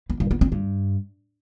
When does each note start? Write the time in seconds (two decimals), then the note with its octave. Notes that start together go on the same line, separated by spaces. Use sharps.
0.10 B3
0.20 G2
0.31 B3
0.41 C4
0.52 G2